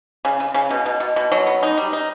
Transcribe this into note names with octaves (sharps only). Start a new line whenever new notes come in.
C#3
C#3
C#3
B2
B2
B2
B2
F#3
B3
D#4
G3
D#4